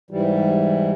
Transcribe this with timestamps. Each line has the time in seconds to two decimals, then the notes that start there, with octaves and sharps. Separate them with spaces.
0.11 G#2 E3 G3